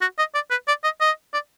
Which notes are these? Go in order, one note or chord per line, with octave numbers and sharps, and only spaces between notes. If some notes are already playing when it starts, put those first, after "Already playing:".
F#4
D#5
D5
B4
D5
D#5
D#5
D5